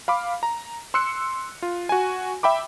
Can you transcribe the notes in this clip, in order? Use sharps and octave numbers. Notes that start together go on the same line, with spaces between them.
F5 B5 D6
A#5
C6 E6 F#6 C#7
F4
F#4 G#5
E5 G5 B5 D6